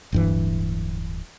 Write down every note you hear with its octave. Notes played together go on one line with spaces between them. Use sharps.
D1 G2 E3